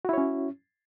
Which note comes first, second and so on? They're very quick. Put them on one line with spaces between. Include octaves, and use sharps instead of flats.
F#4 E4 C#5 C#4